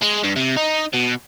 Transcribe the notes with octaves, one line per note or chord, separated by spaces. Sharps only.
G#3
G2
C3
D#4
B2